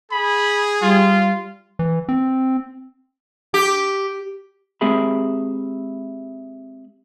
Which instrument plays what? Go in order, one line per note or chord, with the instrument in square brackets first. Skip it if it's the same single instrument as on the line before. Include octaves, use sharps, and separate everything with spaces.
[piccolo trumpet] G#4 [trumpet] B5
[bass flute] G3 [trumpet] F4
[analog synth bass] E3
C4
[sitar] G4
[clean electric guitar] G#3 C4 G4 G#4 E5 B5